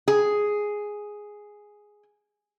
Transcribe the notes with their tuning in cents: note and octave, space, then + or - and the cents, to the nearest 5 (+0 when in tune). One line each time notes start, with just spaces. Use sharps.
G#4 +0